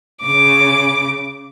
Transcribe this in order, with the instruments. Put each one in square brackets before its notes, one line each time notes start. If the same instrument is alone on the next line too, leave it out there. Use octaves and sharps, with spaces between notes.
[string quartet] C#3 D6